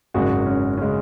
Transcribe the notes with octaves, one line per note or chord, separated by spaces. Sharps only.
G#1 F#2 C#3 G#3 F#4
C#4
C#3 G#3 C#4